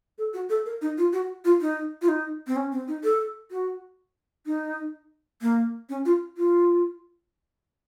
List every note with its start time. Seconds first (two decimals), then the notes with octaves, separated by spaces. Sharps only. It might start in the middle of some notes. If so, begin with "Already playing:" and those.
0.18 A4
0.34 F#4
0.50 A4
0.66 A#4
0.82 D#4
0.98 F4
1.13 F#4
1.45 F4
1.61 D#4
2.02 F4
2.08 D#4
2.47 C4
2.56 C#4
2.72 C4
2.88 D#4
3.04 A4
3.51 F#4
4.46 D#4
5.42 A#3
5.89 C#4
6.05 F4
6.37 F4